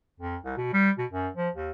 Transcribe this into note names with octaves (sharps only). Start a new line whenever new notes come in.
F2
C2
B2
G3
B2
F#2
F3
D#2